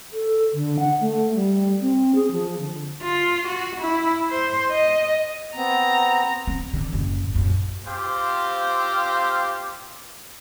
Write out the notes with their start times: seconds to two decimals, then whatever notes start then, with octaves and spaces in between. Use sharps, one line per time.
0.13 A4
0.54 D3
0.79 F#5
1.01 A3
1.35 G3
1.81 C4
2.15 G#4
2.31 F3
2.59 D3
3.02 F4
3.48 F#4
3.81 E4
4.31 C5
4.71 D#5
5.56 B3 C4 A#5
6.47 B3 C4
6.74 D3
6.92 F#1 A2
7.35 A#1 F#2
7.86 C4 F4 G4 C5 F5